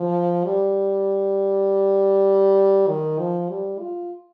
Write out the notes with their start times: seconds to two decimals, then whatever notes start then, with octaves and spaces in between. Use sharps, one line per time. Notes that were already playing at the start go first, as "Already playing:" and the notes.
Already playing: F3
0.45 G3
2.88 D#3
3.19 F3
3.49 G3
3.79 F4